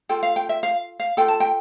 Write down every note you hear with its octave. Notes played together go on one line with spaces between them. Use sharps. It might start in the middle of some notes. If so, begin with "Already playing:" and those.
F4 A4 G5
F5
G5
E5
F5
F5
F4 A4 G5
A5
G5